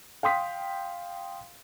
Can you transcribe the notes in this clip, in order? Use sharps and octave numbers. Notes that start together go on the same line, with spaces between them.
F5 G5 C6 D#6 B6